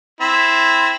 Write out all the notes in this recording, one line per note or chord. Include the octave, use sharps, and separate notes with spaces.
C4 E4